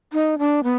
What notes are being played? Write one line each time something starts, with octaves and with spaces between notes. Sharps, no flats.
D#4
D4
B3